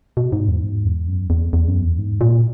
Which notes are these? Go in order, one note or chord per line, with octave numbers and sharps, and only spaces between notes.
B2
G#2
E2
G#2
E2
F#2
E2
E2
F#2
E2
G#2
A#2